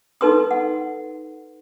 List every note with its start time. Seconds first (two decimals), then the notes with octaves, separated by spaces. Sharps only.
0.21 D#4 A4 B4 C6 D#6
0.51 F#5